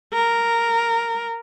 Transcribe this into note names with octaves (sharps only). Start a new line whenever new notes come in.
A#4